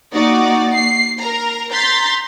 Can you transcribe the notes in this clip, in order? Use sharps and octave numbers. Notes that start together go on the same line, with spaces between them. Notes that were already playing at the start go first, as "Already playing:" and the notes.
A#3 D#4 F#4 D5
C7
A#4 A#5
A#5 C6 G6 A6 B6